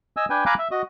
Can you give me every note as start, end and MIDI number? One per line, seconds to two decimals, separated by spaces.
0.17 0.25 75
0.17 0.25 80
0.17 0.25 88
0.30 0.44 62
0.30 0.44 71
0.30 0.44 79
0.30 0.44 80
0.46 0.54 77
0.46 0.54 80
0.46 0.54 82
0.46 0.54 83
0.46 0.54 86
0.46 0.54 90
0.59 0.68 76
0.71 0.82 66
0.71 0.82 75